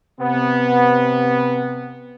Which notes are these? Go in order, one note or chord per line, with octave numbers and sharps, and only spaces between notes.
C3 B3